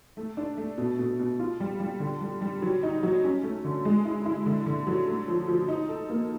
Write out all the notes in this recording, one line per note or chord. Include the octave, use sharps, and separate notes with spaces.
A3
D4
A3
B2
B2
B2
F4
G3
G3
D3
G3
G3
F#3
D#4
F#3
C#4
A3
D3
G#3
E4
E4
D3
D3
F#3
A3
F3
F3
D#4
A4
A#3